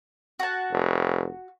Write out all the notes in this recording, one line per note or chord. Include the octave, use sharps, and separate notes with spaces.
F#4 A5
F1